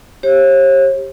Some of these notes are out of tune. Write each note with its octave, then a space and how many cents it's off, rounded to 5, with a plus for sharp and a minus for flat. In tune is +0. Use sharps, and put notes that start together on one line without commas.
G4 +0 C#5 -45